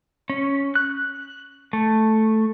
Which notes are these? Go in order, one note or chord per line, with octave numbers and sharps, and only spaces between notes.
C#4
F#6
A3